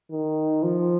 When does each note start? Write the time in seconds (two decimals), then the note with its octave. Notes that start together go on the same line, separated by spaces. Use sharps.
0.12 D#3
0.63 F3